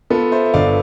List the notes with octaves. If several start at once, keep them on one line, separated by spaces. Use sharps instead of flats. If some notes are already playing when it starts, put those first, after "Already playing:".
B3 F4 A4
C5 E5
E5
G1 D5 F5